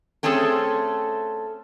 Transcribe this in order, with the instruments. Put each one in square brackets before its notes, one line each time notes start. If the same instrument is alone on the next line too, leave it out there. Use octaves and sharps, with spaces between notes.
[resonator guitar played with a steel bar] A3 C4 C#4 G#4 A4